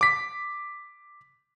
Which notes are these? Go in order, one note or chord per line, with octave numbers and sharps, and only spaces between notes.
D6 B6